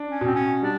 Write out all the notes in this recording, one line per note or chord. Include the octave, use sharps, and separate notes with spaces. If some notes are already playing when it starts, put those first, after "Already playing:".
Already playing: D4
C#4
B2
C4
C#4
G3 D4